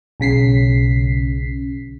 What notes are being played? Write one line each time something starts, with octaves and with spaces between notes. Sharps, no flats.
B1 C#3 B6 C7